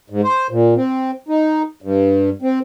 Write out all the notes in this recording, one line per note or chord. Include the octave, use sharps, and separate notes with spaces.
G#2
C5
A#2
C4
D#4
G2
C4